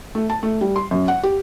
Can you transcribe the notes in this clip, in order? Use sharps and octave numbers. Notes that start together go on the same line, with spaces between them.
A3
A5
A3
G3
C6
F#2
F#5
G4